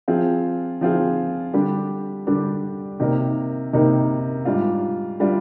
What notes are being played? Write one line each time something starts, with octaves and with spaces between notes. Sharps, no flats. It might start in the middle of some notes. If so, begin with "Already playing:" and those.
F3 C4 F4 G#4
F3 C4 F4 G#4
D3 G3 D4 G4
D3 G3 D4 G4
C3 D#3 A#3 D#4 A#4
C3 D#3 A#3 D#4 A#4
G#2 G3 D4 F4
G3 D4 F4